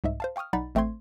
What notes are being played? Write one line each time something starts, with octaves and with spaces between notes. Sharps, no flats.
C2 G#2 D#5 E5
C5 F5 A5
F5 G5 C#6 D#6 F6
B1 D#4 D5 F#5 B5 A6
A1 A3 C4 C5 C6 G#6